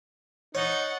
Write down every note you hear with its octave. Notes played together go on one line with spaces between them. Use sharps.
D#4 C#5 F#5 A6